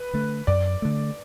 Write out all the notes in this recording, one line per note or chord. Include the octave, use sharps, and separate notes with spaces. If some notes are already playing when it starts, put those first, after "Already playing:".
Already playing: B4
D3 A3
F#2 D5
D3 A3